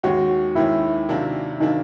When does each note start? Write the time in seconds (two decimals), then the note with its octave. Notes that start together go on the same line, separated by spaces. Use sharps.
0.03 D#2 D#3 G#3 C#4 F#4
0.55 D#2 D#3 G#3 C#4 E4
1.08 C3 D#3 F#3 A#3 D4
1.60 C3 D#3 F#3 A#3 D4 D#4